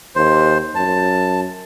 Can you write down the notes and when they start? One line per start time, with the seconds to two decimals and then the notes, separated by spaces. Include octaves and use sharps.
0.16 D#2 C5
0.75 F#2 A5